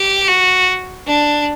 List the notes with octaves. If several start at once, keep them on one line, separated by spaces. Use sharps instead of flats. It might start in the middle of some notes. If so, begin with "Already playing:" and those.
Already playing: G4
F#4
D4